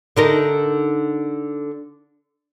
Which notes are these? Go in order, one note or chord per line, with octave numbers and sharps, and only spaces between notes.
D3 D#4 A#4